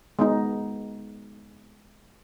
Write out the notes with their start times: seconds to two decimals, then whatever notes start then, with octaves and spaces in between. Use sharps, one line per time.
0.19 G#3 B3 D#4